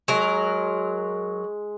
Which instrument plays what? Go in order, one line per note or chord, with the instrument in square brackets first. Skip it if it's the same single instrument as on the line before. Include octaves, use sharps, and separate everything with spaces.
[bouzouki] F#3 A#4 [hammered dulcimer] G#3